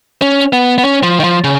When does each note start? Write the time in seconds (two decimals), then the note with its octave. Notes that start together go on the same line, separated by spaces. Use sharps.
0.22 C#4
0.53 B3
0.78 B3
0.84 C#4
1.03 F3
1.20 D#3
1.24 F3
1.44 C#3